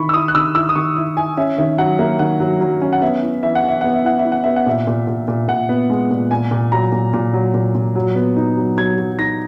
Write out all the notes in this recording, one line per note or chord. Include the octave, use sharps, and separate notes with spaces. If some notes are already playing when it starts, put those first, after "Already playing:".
Already playing: D#3 E4 B5 C#6
E6
E4 D#6
F#6
D#3 E6
E4 E6
D#6
D#3 C#6
E4
E4 G#5
C#4 E5
D#3 E5
F#3 F#5
A#3 E5
D#3 F#5
F#3
F#3
C#4
F#5
B3 E5
E4
E3 E5
F#5
E3 E5
B3 F#5
E5
E4 F#5
E5
E4
F#5
B3 E5
F#5
A#2 E5
A#2
A#2
A#2
A#2 F#5
B3
G#3
A#2
A#2 G#5
A#2
F#3 A#5
A#2
A#2
F#3
A#2
A#2
F#3
B3
D#4
F#3
F#3 G#6
F#3
D#4 A#6